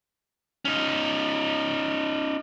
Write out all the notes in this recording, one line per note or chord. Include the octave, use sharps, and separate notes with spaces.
C#4 D#4